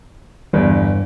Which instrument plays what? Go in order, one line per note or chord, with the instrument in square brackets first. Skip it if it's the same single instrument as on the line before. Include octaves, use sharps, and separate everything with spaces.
[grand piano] G1 E2 [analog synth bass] G2